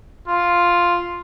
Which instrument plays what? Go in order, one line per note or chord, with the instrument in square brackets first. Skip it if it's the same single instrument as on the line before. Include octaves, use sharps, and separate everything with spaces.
[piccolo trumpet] F4